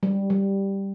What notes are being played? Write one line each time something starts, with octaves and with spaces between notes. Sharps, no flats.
G3
G3